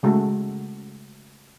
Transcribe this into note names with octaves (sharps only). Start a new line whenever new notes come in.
C#3 G#3 A3 F#4 A4